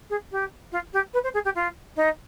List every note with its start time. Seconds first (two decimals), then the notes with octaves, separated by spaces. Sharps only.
0.10 G#4
0.32 G4
0.72 F4
0.93 G4
1.13 B4
1.23 C5
1.34 G#4
1.45 G4
1.55 F4
1.96 D#4